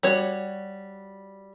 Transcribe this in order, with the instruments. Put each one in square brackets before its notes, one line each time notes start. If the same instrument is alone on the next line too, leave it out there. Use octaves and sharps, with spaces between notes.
[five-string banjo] G3 F#4 C#5